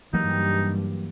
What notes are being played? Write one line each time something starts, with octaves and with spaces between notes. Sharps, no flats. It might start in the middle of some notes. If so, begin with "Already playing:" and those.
G2 E3 F#3 G3 A#3 D#4